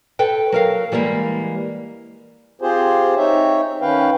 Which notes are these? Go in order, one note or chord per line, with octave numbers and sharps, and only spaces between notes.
A4 B4 G5
F#3 A#4 F5
E3 G3 G#3 A#3
C4 F4 G4 G#4 C5
C4 D#4 C#5 E5
D#3 C#4 B4 F5 G5